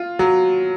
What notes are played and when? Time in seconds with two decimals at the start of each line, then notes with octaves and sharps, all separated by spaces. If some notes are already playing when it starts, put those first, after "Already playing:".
Already playing: F4
0.19 F#3